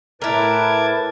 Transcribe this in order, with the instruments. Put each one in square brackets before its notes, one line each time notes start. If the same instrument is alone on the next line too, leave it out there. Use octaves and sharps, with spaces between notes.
[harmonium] A2 B4 [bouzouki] E4 A#4 [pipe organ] A5 D6 G#6